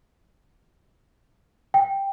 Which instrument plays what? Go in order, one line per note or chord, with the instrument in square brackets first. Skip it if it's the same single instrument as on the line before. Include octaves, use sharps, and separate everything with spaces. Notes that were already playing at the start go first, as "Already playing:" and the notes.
[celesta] G5